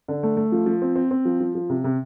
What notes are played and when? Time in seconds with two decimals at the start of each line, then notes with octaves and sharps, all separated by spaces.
0.08 D3
0.23 A3
0.37 A3
0.52 F3
0.66 F3
0.82 C4
0.95 C4
1.11 C4
1.25 F3
1.40 F3
1.55 F3
1.70 C3
1.84 C3